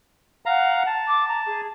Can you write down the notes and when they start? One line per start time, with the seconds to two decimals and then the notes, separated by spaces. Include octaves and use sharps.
0.46 F5 F#5 A#5
0.87 A5
1.07 D6
1.28 A#5
1.46 G#4